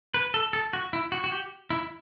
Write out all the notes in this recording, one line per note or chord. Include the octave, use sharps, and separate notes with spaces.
B4
A4
A4
F#4
E4
F#4
F#4
G4
E4